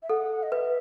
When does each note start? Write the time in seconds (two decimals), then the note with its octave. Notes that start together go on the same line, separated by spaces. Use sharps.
0.02 E5
0.10 A4 F#5
0.43 D#5
0.51 B4 E5